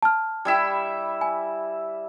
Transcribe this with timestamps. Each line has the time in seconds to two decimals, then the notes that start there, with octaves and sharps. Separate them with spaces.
0.03 A5 F6
0.45 G3 E4 E5
1.21 G#5